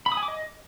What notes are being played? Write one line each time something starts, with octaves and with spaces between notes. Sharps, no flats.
B5
D#6
G#5
D6
D#5